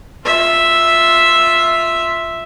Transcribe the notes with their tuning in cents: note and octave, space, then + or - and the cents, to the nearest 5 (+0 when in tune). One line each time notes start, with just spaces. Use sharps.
F4 +0 E5 +0